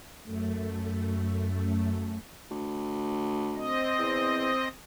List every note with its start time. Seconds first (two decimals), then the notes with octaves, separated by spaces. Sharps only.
0.24 F#2 A3
2.51 D2
3.56 C4 D#5
3.99 E2